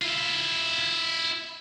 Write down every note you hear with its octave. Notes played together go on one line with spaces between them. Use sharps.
E4 F4